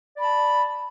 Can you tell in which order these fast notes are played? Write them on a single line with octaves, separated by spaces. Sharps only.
D5 B5 A5